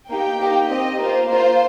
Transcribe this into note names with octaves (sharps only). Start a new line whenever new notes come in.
A#3 D#4 G4 G5
A#3 D#4 G4
C4 G4 D#5
A#3 F4 C5
A#3 F4 C5